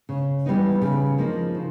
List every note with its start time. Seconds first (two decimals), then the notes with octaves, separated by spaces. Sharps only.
0.09 C#3
0.46 E3 G3 B3 D#4
0.82 C#3
1.18 F3 A#3 D#4
1.54 C#3